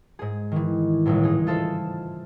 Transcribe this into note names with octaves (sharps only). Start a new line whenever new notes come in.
G#2 G#4
D#3 E3
G1 C#2 A2
D#4 G#4
F4 A4 C5 E5